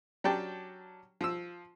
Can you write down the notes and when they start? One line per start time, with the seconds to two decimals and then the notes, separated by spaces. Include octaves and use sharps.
0.24 F#3 C#4 D4 G4 G5 A5
1.21 F3 E6